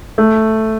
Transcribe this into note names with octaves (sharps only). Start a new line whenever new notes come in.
A3